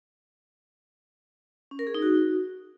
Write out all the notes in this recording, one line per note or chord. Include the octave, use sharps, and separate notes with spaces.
C#4
A#4
G#4
D#4
F#4